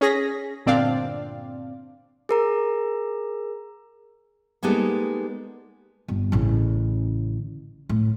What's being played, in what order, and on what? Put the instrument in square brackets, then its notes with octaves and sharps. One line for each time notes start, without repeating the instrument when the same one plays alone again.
[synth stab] C#4 G#4 A#6 B6
G1 A#2 C4 D4 D5 F5
[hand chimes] G#4 A#4 A#5
[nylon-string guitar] G3 G#3 A#3 B3 D#4 A4
[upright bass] G1
A1 C#3
A2